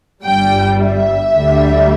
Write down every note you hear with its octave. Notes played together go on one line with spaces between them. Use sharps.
G1 G2 G3 G5
E5
D2 D3 G3